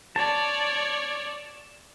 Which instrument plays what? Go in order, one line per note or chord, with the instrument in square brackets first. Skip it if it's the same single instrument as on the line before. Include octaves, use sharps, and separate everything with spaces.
[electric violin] C#5 D5 [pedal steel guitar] A5